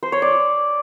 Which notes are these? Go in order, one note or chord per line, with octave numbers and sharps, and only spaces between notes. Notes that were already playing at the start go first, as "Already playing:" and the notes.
C5
C#5
D5